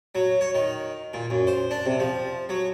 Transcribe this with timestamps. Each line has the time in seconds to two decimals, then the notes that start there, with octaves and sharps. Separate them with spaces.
0.15 F#3
0.41 C#5
0.55 D#3
1.14 A#2
1.30 F#2
1.47 C5
1.71 D4
1.86 C3
2.00 F3
2.49 F#3